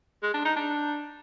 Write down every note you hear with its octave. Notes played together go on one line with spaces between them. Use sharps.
G#3
D4
D#4
D4